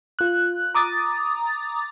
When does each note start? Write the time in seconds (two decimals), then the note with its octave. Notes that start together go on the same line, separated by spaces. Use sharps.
0.19 F4 F#6
0.75 A#5 D6 D#6 A6